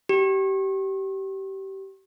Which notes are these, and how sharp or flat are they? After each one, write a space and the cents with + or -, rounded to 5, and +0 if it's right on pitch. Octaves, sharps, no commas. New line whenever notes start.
G4 -25